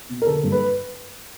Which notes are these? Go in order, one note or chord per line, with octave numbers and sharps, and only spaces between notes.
B2
A#4
D3 A4
G2
B4